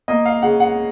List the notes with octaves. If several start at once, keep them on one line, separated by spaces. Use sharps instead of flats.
A#3 D#5
F5
C#3 F#5
F#5